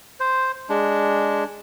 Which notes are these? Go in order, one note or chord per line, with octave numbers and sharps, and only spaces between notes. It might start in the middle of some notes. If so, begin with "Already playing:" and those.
C5
G#3 D4